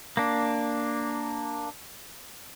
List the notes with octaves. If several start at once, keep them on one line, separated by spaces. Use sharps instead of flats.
A#3 D4